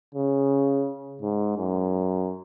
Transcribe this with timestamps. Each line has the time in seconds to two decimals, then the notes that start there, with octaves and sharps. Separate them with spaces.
0.15 C#3
1.22 G#2
1.58 F#2